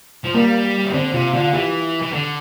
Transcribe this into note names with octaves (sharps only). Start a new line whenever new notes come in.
F3
G3 A#3
E3
D3 C4
C3 F4
D3 F4
E3 G4
E3
D3